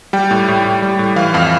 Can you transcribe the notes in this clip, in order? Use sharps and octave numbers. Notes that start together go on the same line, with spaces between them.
G3 G5
A2
A2
A2
G3
A2
E3 F5
F2 F5